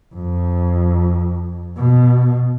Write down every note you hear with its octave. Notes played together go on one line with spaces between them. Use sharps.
F2
B2